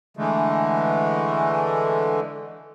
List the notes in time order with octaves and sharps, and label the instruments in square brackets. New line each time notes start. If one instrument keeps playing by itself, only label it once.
[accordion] D3 E3 G#3 A3